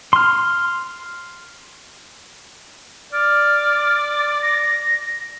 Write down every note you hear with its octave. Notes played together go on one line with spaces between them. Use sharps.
C6 F6
D5 F6
A#6